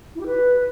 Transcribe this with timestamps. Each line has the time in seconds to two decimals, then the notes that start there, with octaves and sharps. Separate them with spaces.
0.15 E4
0.21 G4
0.26 B4